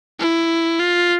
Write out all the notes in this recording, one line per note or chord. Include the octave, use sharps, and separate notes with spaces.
E4
F4